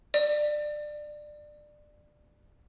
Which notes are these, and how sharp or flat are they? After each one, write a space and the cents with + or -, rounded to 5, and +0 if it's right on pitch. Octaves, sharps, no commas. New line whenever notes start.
D5 +20